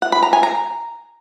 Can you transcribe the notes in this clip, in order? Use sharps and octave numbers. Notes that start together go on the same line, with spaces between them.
F#5
B5
A#5
G#5
A#5